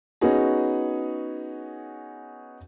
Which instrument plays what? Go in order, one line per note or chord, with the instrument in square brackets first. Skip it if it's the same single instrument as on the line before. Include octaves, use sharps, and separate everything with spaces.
[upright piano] B3 C#4 D#4 F#4 G#4